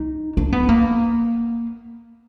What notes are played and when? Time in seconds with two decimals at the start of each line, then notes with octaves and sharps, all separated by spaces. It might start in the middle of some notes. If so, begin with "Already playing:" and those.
Already playing: D#4
0.37 D4
0.52 B3
0.69 A#3